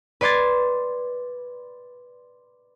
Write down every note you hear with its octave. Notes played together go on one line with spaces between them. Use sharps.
B4 D5 C6 G#6 A6